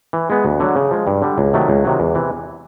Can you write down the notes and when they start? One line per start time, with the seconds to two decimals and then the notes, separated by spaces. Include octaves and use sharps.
0.13 E3
0.30 G#3 B3
0.45 D2
0.60 D3 F#3
0.75 C#3
0.91 F3 G#3
1.07 G2
1.22 D3 G3
1.38 C#2
1.53 C3 D#3 F#3 A3
1.68 C#2
1.84 C3 D#3 F#3
2.00 E2
2.15 C3 E3